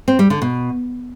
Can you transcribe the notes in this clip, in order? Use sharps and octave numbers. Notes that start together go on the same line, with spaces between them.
C4
G3
D3
B2